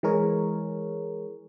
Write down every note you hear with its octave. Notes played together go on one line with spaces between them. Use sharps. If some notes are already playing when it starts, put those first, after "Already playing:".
E3 G#3 G#4 A#4 C#5